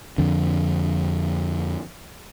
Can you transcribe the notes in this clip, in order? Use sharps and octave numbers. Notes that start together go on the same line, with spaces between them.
F2 D3